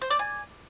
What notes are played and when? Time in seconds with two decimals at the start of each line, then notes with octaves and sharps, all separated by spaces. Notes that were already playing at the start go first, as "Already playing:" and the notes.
0.02 C5
0.10 D5
0.19 G#5